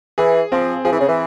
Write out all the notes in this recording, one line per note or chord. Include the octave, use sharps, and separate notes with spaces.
E3 G#4
F3 C4
F3 G#4
E3
C#3
E3